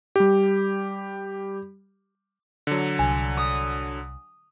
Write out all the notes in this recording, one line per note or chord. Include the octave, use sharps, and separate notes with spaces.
G3 G4
D3 F#3
C2 G#5
D#6